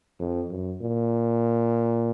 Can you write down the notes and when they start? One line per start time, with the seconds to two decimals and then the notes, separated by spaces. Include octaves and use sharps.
0.20 F2
0.50 F#2
0.82 A#2